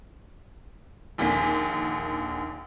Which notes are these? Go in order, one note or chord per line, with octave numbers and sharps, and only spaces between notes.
A#1 D#2 D3 A#3 G#5 B6